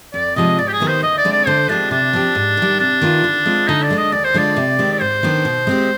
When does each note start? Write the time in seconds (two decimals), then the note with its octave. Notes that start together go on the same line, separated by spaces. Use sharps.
0.14 F2 D5
0.36 C3 F3 G#3 D#5
0.58 G#2 D5
0.68 G4
0.73 G#4
0.80 D#3 B3 D#4 G4
0.88 C5
1.03 D2 D#5
1.17 D5
1.25 D3 G#3 C4
1.33 D5
1.47 D3 C5
1.69 F3 G#3 C4 D4 G4
1.91 C3 D4
2.13 F3 C4 G4
2.35 G#2
2.57 D#3 G3
2.79 C3 D4
3.01 D#3 B3 F4
3.24 D3
3.46 G#3 C4 F4
3.68 D3 D#4
3.83 D5
3.90 G#3 D4
3.98 D#5
4.12 D#2 D5
4.25 C5
4.34 D3 G#3 D4 F4 D5
4.57 C3
4.78 D#3 G#3 C4 G4
4.92 D5
5.01 G#2 C5
5.23 D#3 B3 D4
5.45 B2
5.67 G#3 C4 G4